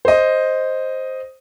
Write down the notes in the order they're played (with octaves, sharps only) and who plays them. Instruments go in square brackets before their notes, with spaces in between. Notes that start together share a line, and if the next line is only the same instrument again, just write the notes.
[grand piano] C5 D#5